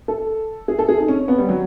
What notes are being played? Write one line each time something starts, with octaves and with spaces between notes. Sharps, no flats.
A4
G#4
A4
G#4
D#4
C#4
C#4
B3
G3
F#3